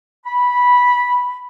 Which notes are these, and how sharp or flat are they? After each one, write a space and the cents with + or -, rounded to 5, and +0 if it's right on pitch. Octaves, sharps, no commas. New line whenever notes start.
B5 -10